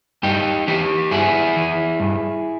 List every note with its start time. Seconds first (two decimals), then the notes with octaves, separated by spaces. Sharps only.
0.23 G2 D#4 G4
0.68 E3 D#4 G4
1.11 G2 E4 G#4
1.56 E3
2.00 G2